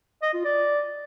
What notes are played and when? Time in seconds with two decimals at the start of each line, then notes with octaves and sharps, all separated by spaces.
0.22 D#5
0.34 F4
0.45 D5